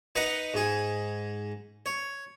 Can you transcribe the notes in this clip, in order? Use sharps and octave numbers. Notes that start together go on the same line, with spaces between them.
D#4 B4 D#5 F#5 A#5
G#2 G#4
C#5